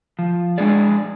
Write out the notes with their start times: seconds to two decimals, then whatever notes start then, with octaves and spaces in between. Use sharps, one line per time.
0.19 F3
0.58 G#3 D4 G#4 D5